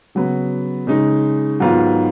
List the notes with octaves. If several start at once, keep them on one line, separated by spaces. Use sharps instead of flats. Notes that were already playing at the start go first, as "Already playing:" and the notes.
C#3 F#3 B3
C#3 G#3 D#4
G#2 D#3 F#3 B3 F4